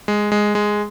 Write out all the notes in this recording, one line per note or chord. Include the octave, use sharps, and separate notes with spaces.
G#3
G#3
G#3